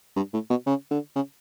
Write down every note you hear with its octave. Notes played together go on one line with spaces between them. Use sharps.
G2
A2
B2
C#3
D3
C#3